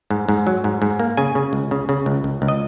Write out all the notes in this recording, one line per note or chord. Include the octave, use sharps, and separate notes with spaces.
G#2
G#2
F#3
G#2
G#2
A#3
C#3 G#5
C#3
C#2
C#3
C#3
C#2
C#2
C#2
D#5